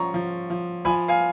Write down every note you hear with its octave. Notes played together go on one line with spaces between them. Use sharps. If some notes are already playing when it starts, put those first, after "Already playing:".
Already playing: F3 C#4 A#5 C#6
F3
F3
F3 G#5 B5
F5 G#5